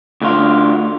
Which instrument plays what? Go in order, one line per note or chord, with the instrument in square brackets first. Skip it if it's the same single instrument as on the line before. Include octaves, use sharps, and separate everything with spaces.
[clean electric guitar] D2 D3 F4